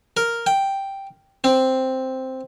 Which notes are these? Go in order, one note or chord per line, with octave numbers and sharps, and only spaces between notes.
A#4
G5
C4